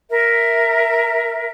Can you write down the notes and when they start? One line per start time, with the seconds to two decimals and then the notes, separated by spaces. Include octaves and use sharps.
0.09 A#4 E5